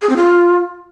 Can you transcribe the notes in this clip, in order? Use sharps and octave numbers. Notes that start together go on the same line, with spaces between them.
G#4
C4
F4